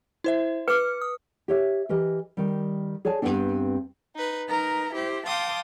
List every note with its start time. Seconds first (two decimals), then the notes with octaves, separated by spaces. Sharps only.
0.24 E4 C5 E5
0.68 B4 D6 F6 C#7
1.01 D#6
1.48 G4 C#5 E5
1.89 E3 G4 A#4 D#5
2.37 D#3 G3
3.05 G#4 C#5 D5 G#5 A5
3.22 G2 D3 B3 C4 D4
4.16 D#4 B4
4.48 D#4 A#4 B4
4.93 E4 G4 C5
5.26 F5 G5 A5 C6 D6 D#6